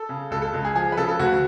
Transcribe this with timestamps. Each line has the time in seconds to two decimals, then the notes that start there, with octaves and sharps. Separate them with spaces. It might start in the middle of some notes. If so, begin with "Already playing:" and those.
Already playing: A4
0.09 C#3
0.31 C#2 A4
0.42 A4
0.53 C#2
0.65 G#4
0.75 F3 G#4
0.92 B4
0.97 C#3 A4
1.08 A4
1.19 D2 F#4